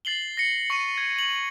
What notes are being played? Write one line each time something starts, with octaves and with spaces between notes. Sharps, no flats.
A6 C7 F#7 G7
A#6 C#7
C#6 C#7 D#7
G#6
F#7